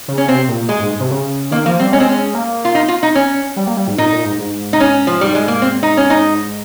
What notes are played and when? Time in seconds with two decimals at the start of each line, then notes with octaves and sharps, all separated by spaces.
0.08 C#3
0.18 C#4
0.28 C3 C4
0.48 A#2
0.69 G#3
0.80 G#2
1.00 C3
1.11 C#3
1.51 D#3 A#3
1.65 F3 A#3
1.79 G3 C4
1.92 G#3 C#4
2.00 C4
2.09 C#4
2.34 A#3
2.65 F4
2.75 D#4
2.88 F4
3.03 D#4
3.15 C#4
3.56 G3
3.67 A#3
3.77 G3
3.88 G#2
3.98 A#2 D#4
4.12 A#2
4.25 G#2
4.39 G#2
4.73 D#4
4.80 C#4
5.07 F3
5.21 G#2 G3
5.35 G#3
5.48 A#3
5.62 C4
5.83 D#4
5.97 C#4
6.10 D#4